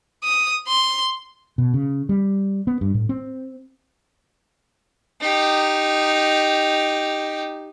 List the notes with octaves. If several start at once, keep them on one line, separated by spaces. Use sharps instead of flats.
D#6
C6
B2
C#3
G3
B3
G2
A2
C4
D#4 G4